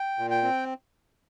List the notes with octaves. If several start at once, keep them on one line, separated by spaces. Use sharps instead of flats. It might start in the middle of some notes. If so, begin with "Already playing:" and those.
Already playing: G5
A#2
G5
C4